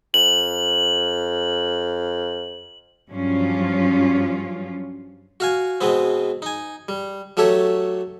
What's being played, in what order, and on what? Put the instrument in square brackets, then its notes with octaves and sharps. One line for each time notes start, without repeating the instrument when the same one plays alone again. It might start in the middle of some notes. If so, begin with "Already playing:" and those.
[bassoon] F2 [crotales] F#7
[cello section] G2 F3 F#3 C#4 F4
[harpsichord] F#4 F5 G#5
B2 G#3 B3 C4
D#4 G#5
G3
F#3 A3 G4 A4 C#5